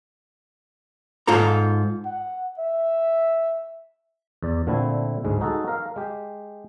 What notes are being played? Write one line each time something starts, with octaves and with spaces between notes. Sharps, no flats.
G#2 F4 A4 A#5
F#5
E5
E2 D5
A#2 D3 A3 C4 E4
D2 G#2 G#3
D#4 F#4 G#4 A4
A#4 F5
G#3 G4